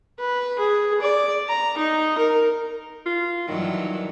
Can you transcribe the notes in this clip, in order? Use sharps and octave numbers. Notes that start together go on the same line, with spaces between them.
B4
G#4
D5
A#5
D#4
A#4
F4
G2 D#3 E3 F#3